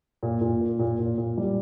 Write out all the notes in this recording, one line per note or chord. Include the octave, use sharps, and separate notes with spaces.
A#2
A#2
A#3
A#2
A#2
A#2
G3